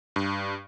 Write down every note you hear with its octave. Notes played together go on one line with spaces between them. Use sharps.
G2